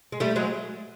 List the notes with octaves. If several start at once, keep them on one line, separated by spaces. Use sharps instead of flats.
G#3
G3 A3
F#3 G#3